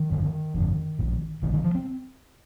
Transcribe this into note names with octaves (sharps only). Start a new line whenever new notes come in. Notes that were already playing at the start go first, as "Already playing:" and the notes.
Already playing: D#3
G1 F2 D3
G1 F2 D3
A#1 A#2
A#1 A#2 D#3
D#3
F3
C4